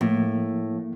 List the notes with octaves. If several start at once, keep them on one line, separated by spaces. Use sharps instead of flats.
A2 F3 A#3